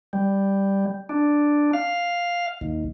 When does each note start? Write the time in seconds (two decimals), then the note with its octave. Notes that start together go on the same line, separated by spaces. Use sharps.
0.13 G3
1.09 D4
1.73 F5
2.61 D#2